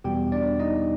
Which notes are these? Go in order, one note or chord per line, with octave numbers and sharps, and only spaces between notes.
E2 B2 G3 B3 G4 G5
D4 D5
D#4 D#5